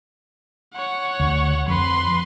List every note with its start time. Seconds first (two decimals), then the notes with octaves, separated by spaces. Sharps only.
0.73 C#5 F#5
1.20 D2
1.68 F2 B4 C6